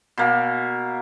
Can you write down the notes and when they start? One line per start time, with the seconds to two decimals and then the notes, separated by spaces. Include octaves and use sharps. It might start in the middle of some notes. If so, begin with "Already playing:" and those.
0.17 B2 A#3